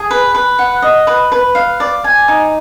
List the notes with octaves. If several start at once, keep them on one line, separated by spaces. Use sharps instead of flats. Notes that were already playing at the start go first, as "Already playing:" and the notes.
Already playing: G#4
B4
B4
F#5
D#5
B4
B4
F5
D5
G#5
D#4